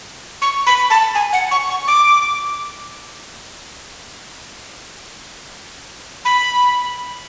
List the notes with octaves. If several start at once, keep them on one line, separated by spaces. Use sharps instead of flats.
C#6
B5
A5
G#5
F#5
C#6
C#6
D6
B5